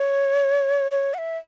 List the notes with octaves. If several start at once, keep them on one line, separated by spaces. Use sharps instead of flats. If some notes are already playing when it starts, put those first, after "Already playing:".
Already playing: C#5
C#5
F#5
E5